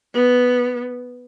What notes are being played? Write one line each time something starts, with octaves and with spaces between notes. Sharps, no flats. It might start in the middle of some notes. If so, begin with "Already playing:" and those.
B3